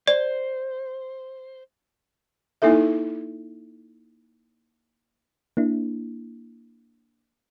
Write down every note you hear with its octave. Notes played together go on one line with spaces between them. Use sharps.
C5 D5
A#3 D#4 E4 A4 E5
A#3 D4 E4